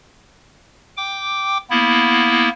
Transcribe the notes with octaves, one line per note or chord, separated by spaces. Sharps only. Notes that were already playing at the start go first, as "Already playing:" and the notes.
G5 D6
A#3 B3 E4